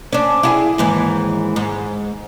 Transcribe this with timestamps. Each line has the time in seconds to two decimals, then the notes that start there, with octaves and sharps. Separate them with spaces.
0.13 C#4 D4
0.43 E4 F#4 G#4
0.78 D#2 G#2 E3
1.56 G#2